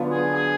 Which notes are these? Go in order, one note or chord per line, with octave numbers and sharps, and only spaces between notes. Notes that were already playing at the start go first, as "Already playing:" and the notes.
Already playing: D3 F#3 B3 D4 F4
G#4
G#4